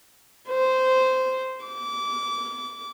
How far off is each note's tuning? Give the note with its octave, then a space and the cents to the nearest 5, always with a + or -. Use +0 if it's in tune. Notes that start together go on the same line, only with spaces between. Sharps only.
C5 -10
D6 -25